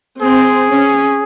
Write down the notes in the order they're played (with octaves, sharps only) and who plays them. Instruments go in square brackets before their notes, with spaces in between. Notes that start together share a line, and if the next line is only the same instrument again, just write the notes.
[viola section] C4 [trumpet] G#4
[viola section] C#4